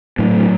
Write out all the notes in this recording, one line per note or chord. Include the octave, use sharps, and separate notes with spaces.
A2 F#3